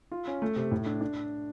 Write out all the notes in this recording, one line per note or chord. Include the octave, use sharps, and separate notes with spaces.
F4
C#4
A3
C3
A2
D4
D4